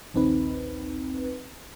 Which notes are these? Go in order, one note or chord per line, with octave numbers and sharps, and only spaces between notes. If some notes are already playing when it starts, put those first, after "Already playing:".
A#1 D#2 C4 D#4 B4